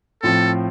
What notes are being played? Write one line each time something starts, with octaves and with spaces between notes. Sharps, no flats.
A2 F3 C4 F4 A4